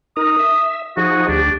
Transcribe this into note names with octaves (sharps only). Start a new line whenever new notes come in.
D#4 A#4 D#6
E5
F3 D#4 F#4 G#4
D2 D4 G4